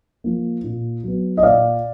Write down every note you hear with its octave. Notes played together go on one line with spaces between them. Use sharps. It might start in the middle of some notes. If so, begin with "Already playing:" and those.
F3 A#3
A#2
F#3 B3
D#5
A#2 D5 F5